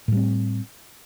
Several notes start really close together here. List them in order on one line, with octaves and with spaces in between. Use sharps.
A2 G3 C4